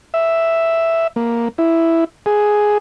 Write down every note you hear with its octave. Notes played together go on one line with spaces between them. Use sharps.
E5
A#3
E4
G#4